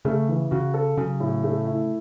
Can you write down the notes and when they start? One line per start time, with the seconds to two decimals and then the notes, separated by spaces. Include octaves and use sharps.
0.05 C#3 A3
0.29 E3
0.51 C#3 F#4
0.74 A4
0.97 C#3 F#3
1.20 A2
1.44 A3
1.66 E4